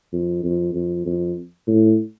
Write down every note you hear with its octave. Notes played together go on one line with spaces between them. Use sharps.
F2
F2
F2
F2
A2